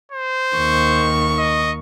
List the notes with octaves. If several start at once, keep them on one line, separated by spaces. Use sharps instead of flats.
C5
D#2 D#3 C#6
D#5